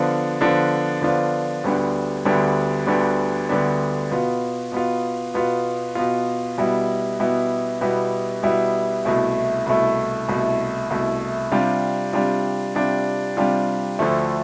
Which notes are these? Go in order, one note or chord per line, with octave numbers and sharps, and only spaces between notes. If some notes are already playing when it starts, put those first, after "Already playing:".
Already playing: D3 F3 B3 D4 F4
D3 F3 B3 D4 F4
D3 F3 B3 D4 F4
D2 D3 G3 B3 D4
D2 D3 G3 B3 D4
D2 D3 G3 B3 D4
D2 D3 G3 B3 D4
B2 B3 F4
B2 B3 F4
B2 B3 F4
B2 B3 F4
B2 G3 B3 E4
B2 G3 B3 E4
B2 G3 B3 E4
B2 G3 B3 E4
C2 B2 A3 E4
C2 B2 A3 E4
C2 B2 A3 E4
C2 B2 A3 E4
C3 G3 D4 F4
C3 G3 D4 F4
C3 G3 D4 F4
C3 G3 D4 F4
D2 D3 F3 A3